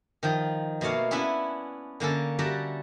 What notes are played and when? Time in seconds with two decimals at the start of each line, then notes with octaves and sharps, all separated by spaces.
0.23 D#3 F3 D#4
0.81 B2 A3 A#3 C#5 F5
1.11 B3 C#4 D4 E4 E5 G#5
2.00 D3 A#3 C#4 A4
2.39 G3 F#4 G4 A4 E5 A#5